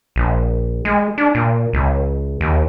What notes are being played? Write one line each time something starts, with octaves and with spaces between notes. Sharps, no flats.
A#1
G#3
D4
A#2
C#2
D#2